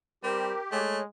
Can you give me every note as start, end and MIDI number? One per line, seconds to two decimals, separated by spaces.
0.23 0.53 55
0.23 0.55 60
0.23 0.81 67
0.23 0.60 70
0.72 1.06 56
0.72 0.99 57
0.72 1.02 73